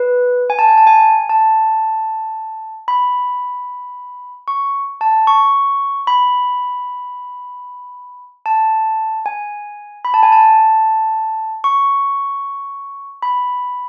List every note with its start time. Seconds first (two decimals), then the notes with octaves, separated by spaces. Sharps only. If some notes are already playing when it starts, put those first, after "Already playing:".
Already playing: B4
0.50 G#5
0.59 A5
0.69 G#5
0.78 A5
0.87 G#5
1.29 A5
2.88 B5
4.48 C#6
5.01 A5
5.27 C#6
6.07 B5
8.46 A5
9.26 G#5
10.05 B5
10.14 A5
10.23 G#5
10.32 A5
11.64 C#6
13.22 B5